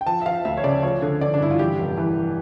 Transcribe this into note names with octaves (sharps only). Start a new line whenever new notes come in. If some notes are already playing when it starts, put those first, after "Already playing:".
G5
F3 A5
E5
F3 F5
D2 E5
C#5
C#3 D5
F3 C#5
D3
D3 D5
D4
G2 E4
F4
E3 G4
F1
E3